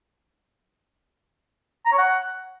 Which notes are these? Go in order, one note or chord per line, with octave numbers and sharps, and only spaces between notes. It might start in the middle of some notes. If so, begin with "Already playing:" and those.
A#5
C#5
F#5